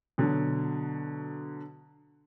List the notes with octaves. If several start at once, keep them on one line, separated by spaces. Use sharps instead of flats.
B2 D3 F#3